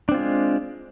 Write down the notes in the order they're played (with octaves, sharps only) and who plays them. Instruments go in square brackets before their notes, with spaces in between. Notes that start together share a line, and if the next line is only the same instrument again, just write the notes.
[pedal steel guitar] D4
C4
F4
G#3